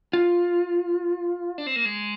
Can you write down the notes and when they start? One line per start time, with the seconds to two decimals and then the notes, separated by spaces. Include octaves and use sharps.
0.13 F4
1.58 D4
1.67 C4
1.76 A#3
1.85 G#3